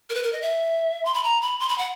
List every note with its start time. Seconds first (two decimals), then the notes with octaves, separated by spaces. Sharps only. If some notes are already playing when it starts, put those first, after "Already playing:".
0.10 A#4
0.14 B4
0.23 A#4
0.33 D#5
0.42 E5
1.05 C6
1.14 B5
1.24 A#5
1.42 B5
1.60 C6
1.69 B5
1.78 F#5